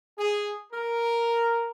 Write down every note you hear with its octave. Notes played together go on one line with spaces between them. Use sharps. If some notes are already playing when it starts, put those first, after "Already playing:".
G#4
A#4